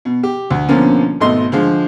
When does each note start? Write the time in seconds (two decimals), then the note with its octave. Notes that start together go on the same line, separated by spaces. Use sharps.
0.05 B2
0.23 G4
0.50 D2
0.69 B2 D3 F3 A#3 C#4
1.20 G#1 B2 A3 D#5 C6
1.52 D3 F3 G#3